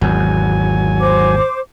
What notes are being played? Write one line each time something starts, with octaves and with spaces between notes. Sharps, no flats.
G#1 E2 F#3 G#5
C5 D6